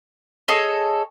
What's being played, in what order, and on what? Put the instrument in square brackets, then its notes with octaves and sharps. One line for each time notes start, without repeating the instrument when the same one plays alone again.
[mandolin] G#4 A4 C#5 D#5